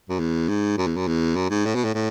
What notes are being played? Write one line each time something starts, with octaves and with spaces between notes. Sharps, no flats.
F#2
E2
G#2
F#2
E2
F#2
E2
F#2
G#2
A2
B2
A2
A2